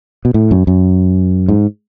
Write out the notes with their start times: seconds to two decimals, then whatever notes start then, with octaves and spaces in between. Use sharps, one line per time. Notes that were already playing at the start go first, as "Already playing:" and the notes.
0.25 B2
0.34 A2
0.51 F#2
0.67 F#2
1.48 G#2